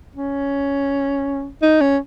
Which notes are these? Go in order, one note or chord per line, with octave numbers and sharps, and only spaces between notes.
C#4
D#4
C#4